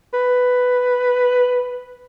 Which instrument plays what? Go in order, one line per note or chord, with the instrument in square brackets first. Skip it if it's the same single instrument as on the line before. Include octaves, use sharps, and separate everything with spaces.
[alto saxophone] B4